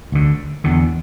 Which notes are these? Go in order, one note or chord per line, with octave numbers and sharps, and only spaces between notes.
D2 D3
E2 D3